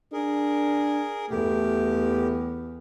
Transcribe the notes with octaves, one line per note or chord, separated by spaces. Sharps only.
D4 G#4 A#4
E2 A3 G4